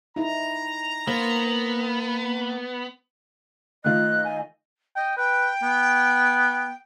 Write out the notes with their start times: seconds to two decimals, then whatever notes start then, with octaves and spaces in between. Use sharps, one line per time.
0.16 D#4 E4 A#5
1.07 A#3 B3 C5
3.84 D#3 A3 F4 D#5 F#6
4.25 G#5
4.96 D#5 G5
5.17 B4 G5
5.63 B3